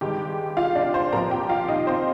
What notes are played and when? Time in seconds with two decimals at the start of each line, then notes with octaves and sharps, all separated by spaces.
0.01 G2 D#3 G#3 G4 G5
0.57 F4 F5
0.75 D4 D5
0.94 C5 C6
1.12 A#2 F3 C4 A#4 A#5
1.31 G4 G5
1.49 F4 F5
1.68 D#4 D#5
1.87 C4 C5